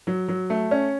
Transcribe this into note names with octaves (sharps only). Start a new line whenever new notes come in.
F#3
F#3
A3
C#4